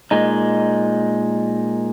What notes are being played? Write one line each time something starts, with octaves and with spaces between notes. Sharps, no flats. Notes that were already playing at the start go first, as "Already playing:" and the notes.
A#2 G#3 D#4